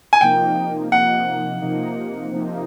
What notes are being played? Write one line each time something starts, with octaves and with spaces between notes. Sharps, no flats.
G#5
C3 F3 A#3 D#4 G5
C3 F3 A#3 D#4 F#5
C3 F3 A#3 D#4
C3 F3 A#3 D#4